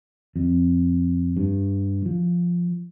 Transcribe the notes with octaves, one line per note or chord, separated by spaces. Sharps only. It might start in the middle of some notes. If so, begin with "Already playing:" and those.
F2
G2
F3